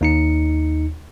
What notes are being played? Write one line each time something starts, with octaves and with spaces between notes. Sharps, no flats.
D#2 D#4 C#7